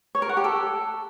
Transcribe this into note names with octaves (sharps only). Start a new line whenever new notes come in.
C#5
A#4
F#5
G4
A4